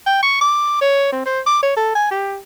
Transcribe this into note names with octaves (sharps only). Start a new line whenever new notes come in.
G5
C#6
D6
C#5
C4
C5
D6
C#5
A4
G#5
G4